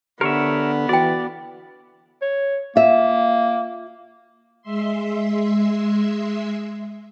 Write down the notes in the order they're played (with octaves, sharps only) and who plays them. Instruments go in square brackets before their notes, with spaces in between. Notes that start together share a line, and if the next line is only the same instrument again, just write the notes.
[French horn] D3 [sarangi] B3 [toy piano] G4 [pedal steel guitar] A#4 C#5 E5
[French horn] E3 [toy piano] F#4 G5 [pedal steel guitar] D5
[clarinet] C#5
[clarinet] A#3 [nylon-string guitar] F4 E5
[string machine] G#3 E5 C6